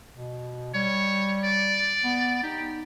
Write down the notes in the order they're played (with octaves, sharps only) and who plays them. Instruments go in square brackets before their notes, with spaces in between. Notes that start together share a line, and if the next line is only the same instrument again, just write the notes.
[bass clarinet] B2
[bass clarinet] G3 [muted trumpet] C#5
[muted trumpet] D5
[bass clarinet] B3
[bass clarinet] D#4 [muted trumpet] G4